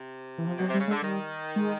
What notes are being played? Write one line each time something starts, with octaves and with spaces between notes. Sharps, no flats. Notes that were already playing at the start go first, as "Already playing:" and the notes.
Already playing: C3
E3
F3
B2 F#3
C3
G3
C#3
G#3
D3
D#3 G3
G#3